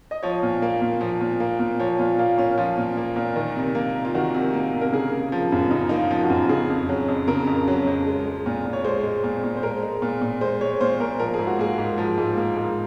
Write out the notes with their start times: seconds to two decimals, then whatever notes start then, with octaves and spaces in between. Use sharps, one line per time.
0.11 D#5
0.23 F3 C#5
0.43 A#2
0.62 A#3
0.81 A#2
1.01 F3
1.21 A#2
1.40 A#3
1.60 A#2
1.80 F3 C#5
1.99 A#2 F4
2.18 A#3 F4
2.38 A#2 C#4
2.58 F3 F4
2.77 A#2
2.97 A#3
3.16 A#2
3.36 D#3
3.56 C3
3.75 A#3
3.95 C3
4.05 F4
4.14 D#3 F#4
4.34 C3
4.53 A#3
4.73 C3
4.81 A#4
4.93 C#3 G#4
5.12 A#3
5.32 F3
5.52 F#2
5.71 C#3 D#4
5.89 A#3 D#4
5.98 F4
6.11 F3
6.24 F#4
6.30 F#2
6.49 C#3 G#4
6.70 F2
6.89 F#3
7.08 F2
7.28 C#3 A#4
7.47 F2
7.68 F#3
7.87 F2
8.06 G#3
8.25 G#3
8.46 A#2
8.65 A#2
8.73 C#5
8.84 G#3 C5
9.04 G#3
9.24 A#2
9.44 A#2
9.57 C5
9.63 G#3 A#4
9.83 G#3
10.02 A#2
10.22 A#2
10.41 G#3 C5
10.61 G#3 C#5
10.81 A#2 C5
11.00 A#2 A#4
11.20 F3 A#4
11.34 G#4
11.39 G#2
11.47 F#4
11.59 A#3 G#4
11.78 G#2
11.98 F3
12.18 G#2
12.37 A#3
12.57 G#2